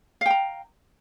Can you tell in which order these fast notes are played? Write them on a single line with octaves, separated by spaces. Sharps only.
F5 G5 A#5